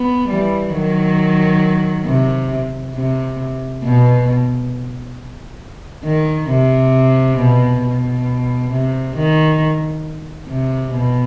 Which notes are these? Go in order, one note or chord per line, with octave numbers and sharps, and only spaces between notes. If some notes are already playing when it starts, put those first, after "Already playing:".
Already playing: B3
E3 G3
D#3 F#3
C3
C3
B2
D#3
C3
B2
B2
C3
D#3
C3
B2